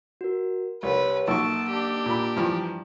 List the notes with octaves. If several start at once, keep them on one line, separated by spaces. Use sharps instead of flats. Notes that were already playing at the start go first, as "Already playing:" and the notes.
F#4 A#4
C2 G4 B4 C#5
B1 A#3 E5 A5 C#6 E6 D7
D4 G4
A#2 B5
G2 E3 F3 A#5